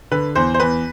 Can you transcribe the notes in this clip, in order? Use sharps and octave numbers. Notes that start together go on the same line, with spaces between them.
D3 B4
E2 C5
C5
E2 B4